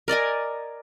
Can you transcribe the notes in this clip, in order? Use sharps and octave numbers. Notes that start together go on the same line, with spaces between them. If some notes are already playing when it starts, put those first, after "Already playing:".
A#4 D5 D#5 G#5